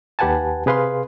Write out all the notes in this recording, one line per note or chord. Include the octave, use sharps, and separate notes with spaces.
D#2 G4 B4 F#5 G#5 A5
C3 G#4 B4 F5 C6